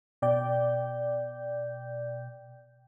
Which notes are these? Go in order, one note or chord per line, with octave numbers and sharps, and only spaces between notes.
B2 D5 G5 G6